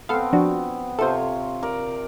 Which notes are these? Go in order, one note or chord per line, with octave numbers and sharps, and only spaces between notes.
B3 C4 A4 F5
F3 D4 F#4
C3 F4 A4 C5 C#5
A#4 D5